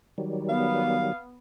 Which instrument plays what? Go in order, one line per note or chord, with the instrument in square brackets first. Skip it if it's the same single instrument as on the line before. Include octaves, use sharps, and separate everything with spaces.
[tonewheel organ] D#3 F#3 G3
[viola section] B3 [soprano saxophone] F5